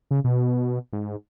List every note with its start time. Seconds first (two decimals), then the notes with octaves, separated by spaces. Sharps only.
0.11 C#3
0.24 B2
0.93 G#2